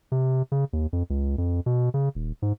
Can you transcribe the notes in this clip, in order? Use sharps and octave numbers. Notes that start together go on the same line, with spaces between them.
C3
C#3
D#2
F2
C#2
F2
B2
C#3
D#1
G#2